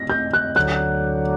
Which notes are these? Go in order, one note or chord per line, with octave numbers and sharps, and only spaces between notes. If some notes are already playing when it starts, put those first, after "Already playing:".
Already playing: A#6
G6
F#6
D2 D3 F#3 F#6